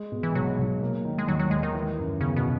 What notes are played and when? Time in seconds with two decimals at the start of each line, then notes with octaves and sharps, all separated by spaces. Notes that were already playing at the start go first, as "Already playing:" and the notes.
Already playing: G#3
0.12 B2
0.23 E3
0.35 B1 F#3
0.58 B1
0.81 A#3
1.05 D#3
1.18 G#3
1.28 D#2 F#3
1.39 F#3
1.51 D#2 G#3
1.63 D#3
1.74 E3
1.98 F#2
2.21 C#3 B3
2.36 B2